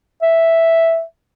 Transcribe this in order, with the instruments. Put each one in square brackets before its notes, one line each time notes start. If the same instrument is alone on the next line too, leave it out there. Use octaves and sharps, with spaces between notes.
[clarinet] E5